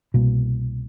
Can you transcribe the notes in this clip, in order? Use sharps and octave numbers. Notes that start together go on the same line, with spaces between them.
C2 B2 G3 A#3